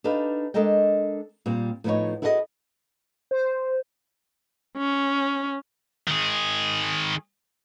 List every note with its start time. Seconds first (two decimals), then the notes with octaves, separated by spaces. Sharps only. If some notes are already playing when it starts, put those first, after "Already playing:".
0.04 D4 D#4 G4 A4 B4 F5
0.54 G#3 D4 A4 A#4 D#5 G5
1.46 A#2 G3 C4
1.84 A2 F3 A#3 B3 D#4 C#5
2.22 E4 F#4 G#4 A4 C#5 D#5
3.31 C5
4.78 C#4
6.07 D#3 G#4